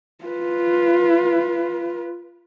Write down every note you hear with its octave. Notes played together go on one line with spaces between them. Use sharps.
F4 B4